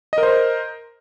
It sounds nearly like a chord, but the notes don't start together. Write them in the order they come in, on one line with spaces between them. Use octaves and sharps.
D#5 A#4 C5